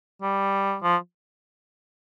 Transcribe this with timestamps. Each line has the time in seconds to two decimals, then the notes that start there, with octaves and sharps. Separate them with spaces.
0.22 G3
0.83 F3